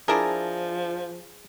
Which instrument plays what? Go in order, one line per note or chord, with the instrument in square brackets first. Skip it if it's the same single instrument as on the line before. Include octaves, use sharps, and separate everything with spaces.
[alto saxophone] F3 [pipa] D4 E4 A#4 [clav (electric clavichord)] G#4